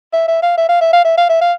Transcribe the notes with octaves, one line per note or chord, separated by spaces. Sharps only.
E5
E5
F5
E5
F5
E5
F5
E5
F5
E5
F5